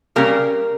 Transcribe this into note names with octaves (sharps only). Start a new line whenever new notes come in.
C#3 G3 A#3 C#4 A#4